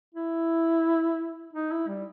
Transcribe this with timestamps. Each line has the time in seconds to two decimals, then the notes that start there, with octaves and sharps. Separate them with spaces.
0.15 E4
1.53 D#4
1.72 E4
1.88 G3